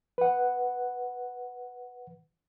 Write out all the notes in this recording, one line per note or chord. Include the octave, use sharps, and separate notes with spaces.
B4 F#5